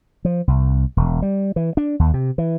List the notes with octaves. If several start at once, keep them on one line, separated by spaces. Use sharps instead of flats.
F3
C2
E1
G3
E3
D4
D#2
C3
E3